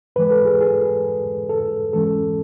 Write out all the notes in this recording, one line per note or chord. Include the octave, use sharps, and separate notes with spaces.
G#2 E3 G#3 B4
A4
G#4
G#4
A4
G#2 E3 G#3 C#4 A4